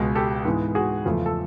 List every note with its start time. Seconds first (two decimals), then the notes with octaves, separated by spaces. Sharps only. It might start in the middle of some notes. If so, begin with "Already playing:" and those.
Already playing: C#2 B2 G#3 B3
0.15 G4 A4
0.45 G#2 E3 G#3 B3
0.75 F#4 G#4
1.05 E2 C#3 F3 A3
1.26 A4